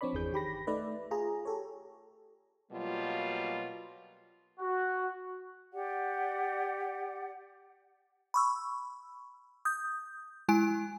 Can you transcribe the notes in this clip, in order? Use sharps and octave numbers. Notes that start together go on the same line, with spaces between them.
F3 C4 D4 C#5 D5 B5
G1 E2 E3 G#4 G6
D#3 G4 B5 A#6
A3 D#4 B4 D5 E5
F4 G#4 A#5
G4 A4 C#5
B2 F#3 G3 A#3 F4
F#4
G4 D5 F#5
B5 C#6 E6
D#6 G6
G#3 E4 G#5 D7